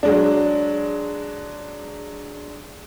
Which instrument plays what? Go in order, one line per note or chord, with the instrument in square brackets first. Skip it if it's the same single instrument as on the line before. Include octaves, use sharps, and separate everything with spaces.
[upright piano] F#3 G#3 D4